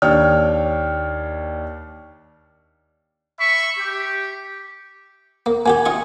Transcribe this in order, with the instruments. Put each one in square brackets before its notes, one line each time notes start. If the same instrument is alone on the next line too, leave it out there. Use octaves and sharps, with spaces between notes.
[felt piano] D#2 D4 C#5 G5 F6
[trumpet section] E5 B5 C#6
G4
[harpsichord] A#3
[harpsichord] A#3 F#4 G4 [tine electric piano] G#5
[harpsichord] F4 D#5 C#6